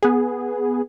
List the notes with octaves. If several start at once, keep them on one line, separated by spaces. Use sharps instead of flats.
B3 G#4